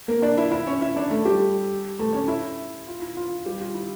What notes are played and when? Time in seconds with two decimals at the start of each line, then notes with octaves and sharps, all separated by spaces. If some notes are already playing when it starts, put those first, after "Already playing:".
0.08 A#3 A#4
0.22 D4 D5
0.37 E4 E5
0.51 E4 E5
0.67 C#4 C#5
0.81 E4 E5
0.96 D4 D5
1.10 A3 A4
1.25 G3 G4
1.99 A3 A4
2.13 C#4 C#5
2.28 E4 E5
2.87 F4
3.02 E4
3.17 F4
3.46 G3 G4
3.60 F4
3.74 E4